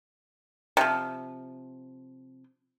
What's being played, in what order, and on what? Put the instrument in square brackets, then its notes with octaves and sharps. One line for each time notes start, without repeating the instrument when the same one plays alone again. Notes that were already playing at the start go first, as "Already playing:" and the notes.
[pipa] C3 F3